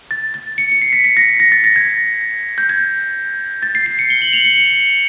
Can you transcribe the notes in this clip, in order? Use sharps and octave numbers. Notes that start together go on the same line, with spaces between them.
A6
A6
C#7
C#7
C7
B6
B6
A#6
A#6
A6
A#6
G#6
G6
G#6
A6
C7
C7
C#7
G7
F#7
F7
C#7
C#7